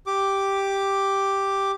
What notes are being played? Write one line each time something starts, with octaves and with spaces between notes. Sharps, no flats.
G4 D6